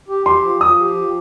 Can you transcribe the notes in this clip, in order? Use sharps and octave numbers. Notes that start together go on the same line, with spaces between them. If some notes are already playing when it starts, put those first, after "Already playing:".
G4
G4 C6
F3
F3 D#6
G4
F3